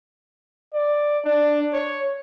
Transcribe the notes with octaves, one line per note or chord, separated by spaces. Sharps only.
D5
D4
C#5